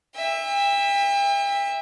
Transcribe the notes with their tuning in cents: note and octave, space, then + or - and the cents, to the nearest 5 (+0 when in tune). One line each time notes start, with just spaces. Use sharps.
E5 +0 G5 +40